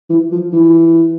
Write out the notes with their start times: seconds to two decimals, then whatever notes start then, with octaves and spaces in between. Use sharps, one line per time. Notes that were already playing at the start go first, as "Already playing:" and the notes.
0.10 E3
0.32 F3
0.53 E3